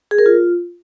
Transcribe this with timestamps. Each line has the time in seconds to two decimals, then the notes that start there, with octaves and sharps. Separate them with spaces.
0.11 G#4
0.19 A#4
0.26 F4